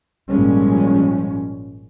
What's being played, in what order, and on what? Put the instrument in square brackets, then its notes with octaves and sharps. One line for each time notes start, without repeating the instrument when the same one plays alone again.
[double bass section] G#1 A#2 F3 G3 G#3 C#4